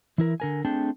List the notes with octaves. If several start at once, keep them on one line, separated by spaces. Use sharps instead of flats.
E3 E4 A#4
D3 A#4 G#5
A3 C4 D4 G#4 G5 A5